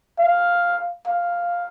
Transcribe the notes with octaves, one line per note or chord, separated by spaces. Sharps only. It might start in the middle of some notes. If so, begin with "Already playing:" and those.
F5
F5